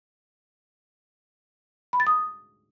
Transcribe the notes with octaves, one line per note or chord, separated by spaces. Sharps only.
B5
A6
D#6